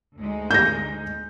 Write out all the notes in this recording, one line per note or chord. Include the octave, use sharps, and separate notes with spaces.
D2 G#3 D#4
G6 A#6